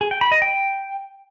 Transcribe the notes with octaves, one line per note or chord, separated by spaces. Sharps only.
G#4
G5
B5
D#5
G5